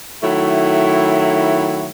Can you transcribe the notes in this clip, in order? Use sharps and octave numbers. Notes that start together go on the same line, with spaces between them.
D#3 F#3 A3 E4